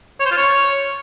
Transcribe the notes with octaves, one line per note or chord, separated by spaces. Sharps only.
C#5
C5
F4
C#5